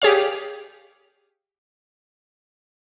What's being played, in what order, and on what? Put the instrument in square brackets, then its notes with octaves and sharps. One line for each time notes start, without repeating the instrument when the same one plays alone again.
[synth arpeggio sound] G4 G#4 C#5 F5